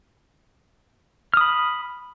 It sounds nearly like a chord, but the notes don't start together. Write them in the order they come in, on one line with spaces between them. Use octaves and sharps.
F6 D#6 B5